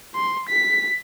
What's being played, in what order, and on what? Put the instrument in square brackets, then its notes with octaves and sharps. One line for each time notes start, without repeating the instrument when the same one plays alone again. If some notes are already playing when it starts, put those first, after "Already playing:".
[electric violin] C6
B6